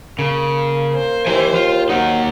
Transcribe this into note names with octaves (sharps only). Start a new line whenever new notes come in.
C#3 A#3
C5
D#2 E3 G#5
F4
F#3 A#3 D#4